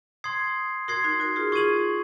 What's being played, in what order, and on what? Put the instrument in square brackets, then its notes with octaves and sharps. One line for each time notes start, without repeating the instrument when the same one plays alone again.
[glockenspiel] C6 D#6 G#6 C7
[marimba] F#4 A#4 [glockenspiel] C6 D#6 G#6 C7
[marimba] D#4 F#4
F#4 A#4
F4 G#4
[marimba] F4 G#4 [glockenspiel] C#6 G#6 D#7 F#7